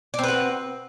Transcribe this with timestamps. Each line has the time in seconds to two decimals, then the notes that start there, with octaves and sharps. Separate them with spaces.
0.14 D5
0.19 C4
0.23 B4
0.28 F#4